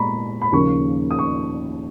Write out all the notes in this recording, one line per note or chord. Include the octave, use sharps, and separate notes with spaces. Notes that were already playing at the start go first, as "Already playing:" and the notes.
Already playing: A#2 G#3 B3 A#5 B5 C#6
B5
D#2 C#3 F3 A#3 C#4 C#6
D#6
C#6